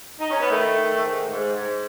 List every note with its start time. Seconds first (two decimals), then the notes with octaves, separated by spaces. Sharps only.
0.20 D#4
0.30 C#4
0.40 B3
0.50 D#3 A3
0.76 D#3
1.02 G#2
1.29 G#2
1.55 G#2